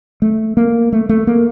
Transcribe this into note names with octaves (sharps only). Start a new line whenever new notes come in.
A3
A#3
A3
A3
A#3